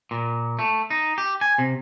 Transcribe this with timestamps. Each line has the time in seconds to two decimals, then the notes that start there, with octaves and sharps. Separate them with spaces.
0.11 A#2
0.59 A3
0.90 D#4
1.18 G4
1.41 G#5
1.58 C3